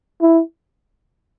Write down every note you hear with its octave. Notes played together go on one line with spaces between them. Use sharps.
E4